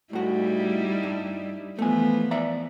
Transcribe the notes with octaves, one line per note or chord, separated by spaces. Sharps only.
A2 G3 D#4 E4 F#4
G2
E3 F3 A3 B3 G#5
D5 E5 A#5